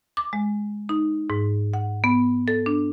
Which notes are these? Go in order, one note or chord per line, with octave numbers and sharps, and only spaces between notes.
D6
G#3
D#4
G#2
F#5
B3
A4
D4